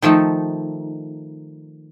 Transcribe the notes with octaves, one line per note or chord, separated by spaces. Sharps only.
D#3 F3 A3 D#4